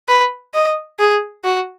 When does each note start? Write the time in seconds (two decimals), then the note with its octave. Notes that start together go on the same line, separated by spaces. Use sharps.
0.08 B4
0.54 D#5
0.99 G#4
1.45 F#4